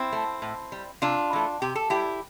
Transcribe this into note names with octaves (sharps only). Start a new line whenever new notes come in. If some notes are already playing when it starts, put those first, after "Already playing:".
Already playing: C4 E4
A3
A2
G3
C3 D4 F4
E3 A3
C3 G4
A4
G3 E4 G4